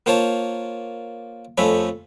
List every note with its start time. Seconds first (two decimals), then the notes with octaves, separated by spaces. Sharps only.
0.06 A#3 F4 C5 C#5 A5
1.58 F2 F3 A3 C#4 B5